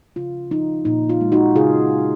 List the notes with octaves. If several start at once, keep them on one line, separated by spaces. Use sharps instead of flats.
C#3 F4
F3 D#4
A#2 D#4
F4
G#3
D#4 F#4
C#3 F4 G#4